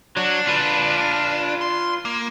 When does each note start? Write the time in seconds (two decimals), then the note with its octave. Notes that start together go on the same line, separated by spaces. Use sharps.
0.17 F#3 D4 F#4
0.47 F4 B4
1.61 C6
2.05 A#3